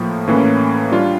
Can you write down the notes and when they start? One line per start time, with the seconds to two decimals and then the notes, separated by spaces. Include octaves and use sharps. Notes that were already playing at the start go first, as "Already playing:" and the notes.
Already playing: A2 F3 A#3
0.28 A2 E3 A#3 C#4
0.92 G3 D4 F4